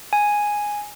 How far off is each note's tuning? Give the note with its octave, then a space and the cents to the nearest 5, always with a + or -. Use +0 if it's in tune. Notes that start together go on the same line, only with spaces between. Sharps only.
G#5 +0